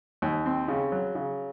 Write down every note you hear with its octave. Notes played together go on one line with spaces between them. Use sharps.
D#2
C4
C#3
F#3
C#3